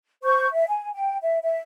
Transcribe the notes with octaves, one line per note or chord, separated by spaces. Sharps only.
C5 C#6 G6
E5
G#5
G5
E5
E5